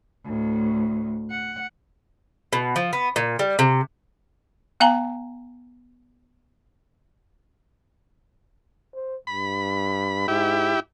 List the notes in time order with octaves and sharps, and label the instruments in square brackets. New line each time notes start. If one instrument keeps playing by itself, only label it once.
[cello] D2 A2
F#5
[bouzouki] B2
F3
B3
A#2
G3
C3
[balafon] B3 F5 G#5 A#5
[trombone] C5
[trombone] G2 [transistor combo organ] B5
[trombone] G#2 [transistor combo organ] E4 G4